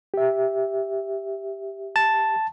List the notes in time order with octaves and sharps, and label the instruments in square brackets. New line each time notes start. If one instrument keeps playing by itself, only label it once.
[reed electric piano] G4 E5
[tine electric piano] A5